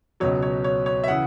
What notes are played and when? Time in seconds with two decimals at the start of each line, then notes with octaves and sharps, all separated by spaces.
0.20 C#2 B2 F#3 C#5
0.42 C#5
0.64 C#5
0.86 C#5
1.04 E5
1.08 C#3 E3 F#5